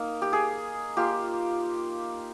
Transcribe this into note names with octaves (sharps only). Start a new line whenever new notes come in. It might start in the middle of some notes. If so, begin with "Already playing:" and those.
Already playing: A#3 D#4
G4
G#4
A#3 F4 G4